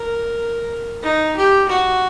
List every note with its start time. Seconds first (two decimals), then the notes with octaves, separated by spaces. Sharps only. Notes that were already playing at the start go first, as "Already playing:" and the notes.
Already playing: A#4
1.03 D#4
1.36 G4
1.69 F#4